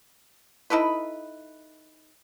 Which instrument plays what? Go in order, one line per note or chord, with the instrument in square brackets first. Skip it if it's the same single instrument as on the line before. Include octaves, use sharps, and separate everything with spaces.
[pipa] D#4 E4 A4 B4